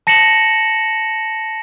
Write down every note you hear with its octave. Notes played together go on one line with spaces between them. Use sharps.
A5 A#6 C#7 E7 F#7